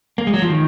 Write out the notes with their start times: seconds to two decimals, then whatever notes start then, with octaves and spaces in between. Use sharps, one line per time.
0.18 A#3
0.27 G#3
0.34 F#3
0.42 F3
0.50 D#3